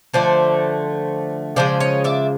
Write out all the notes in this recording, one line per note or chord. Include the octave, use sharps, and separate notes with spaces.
D3 F3 A3 C5 D5
C#3 F3 G#3 C5 D5
C#5 D#5
D5 E5